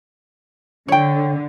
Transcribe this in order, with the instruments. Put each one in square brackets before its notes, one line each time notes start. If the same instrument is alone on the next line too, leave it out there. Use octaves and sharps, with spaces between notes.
[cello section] D3 [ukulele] C#5 G5